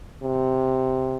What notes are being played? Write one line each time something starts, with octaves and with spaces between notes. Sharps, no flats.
C3